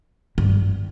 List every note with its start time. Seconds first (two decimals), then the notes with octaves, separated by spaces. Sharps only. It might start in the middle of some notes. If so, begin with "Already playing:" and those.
0.38 G2